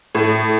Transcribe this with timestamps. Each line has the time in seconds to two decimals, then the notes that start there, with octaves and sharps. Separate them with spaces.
0.15 A2